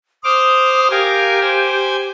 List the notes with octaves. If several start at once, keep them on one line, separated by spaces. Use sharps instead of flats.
C5 D6 D#6 F6
G4 A#4 F5 G#5
C5 G#5